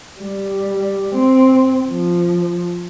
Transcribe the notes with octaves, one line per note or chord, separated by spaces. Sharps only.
G3
C4
F3